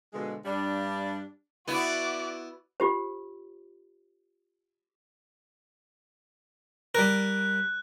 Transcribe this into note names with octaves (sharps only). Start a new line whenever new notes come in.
B2 D3 F3 G#3
G2 G3 D4
B3 E4 F#4 D5
F4 G4 C5
G3 A#4 F#6